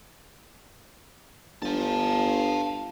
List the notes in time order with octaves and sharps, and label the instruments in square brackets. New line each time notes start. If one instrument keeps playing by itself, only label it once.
[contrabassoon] G1 [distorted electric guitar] F5 A5